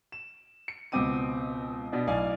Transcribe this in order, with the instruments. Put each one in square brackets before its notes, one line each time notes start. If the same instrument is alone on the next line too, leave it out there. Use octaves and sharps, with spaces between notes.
[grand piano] E7
C#7
C#2 B2 B3 C4 D6 D#7
B2 B3 D4
B1 A2 D5 F5 G#5